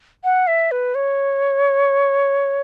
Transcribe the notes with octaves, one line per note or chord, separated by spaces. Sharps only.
F#5
E5
B4
C#5